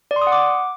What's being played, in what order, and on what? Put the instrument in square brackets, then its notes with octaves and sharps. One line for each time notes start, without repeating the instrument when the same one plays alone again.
[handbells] D5
C6
D#6
F#5
D6